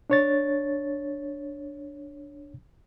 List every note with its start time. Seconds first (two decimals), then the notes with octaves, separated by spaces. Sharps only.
0.10 D4 C#5 A6